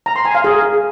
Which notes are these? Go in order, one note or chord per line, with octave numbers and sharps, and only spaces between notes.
A#5
C6
G#5
F5
G#4